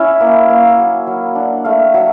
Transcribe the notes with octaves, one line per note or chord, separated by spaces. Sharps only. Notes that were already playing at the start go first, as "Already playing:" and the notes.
Already playing: C#4 E4 E5
A#3
A#3
F#3
F#3
D4
A3 F5
F#3